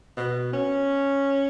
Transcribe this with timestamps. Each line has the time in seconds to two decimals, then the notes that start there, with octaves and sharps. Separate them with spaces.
0.17 B2
0.53 C#4